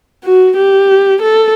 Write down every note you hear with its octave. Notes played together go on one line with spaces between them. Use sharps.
F#4
G4
A4